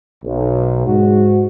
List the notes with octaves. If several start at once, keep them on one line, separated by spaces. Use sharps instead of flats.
B1
G#2 F#4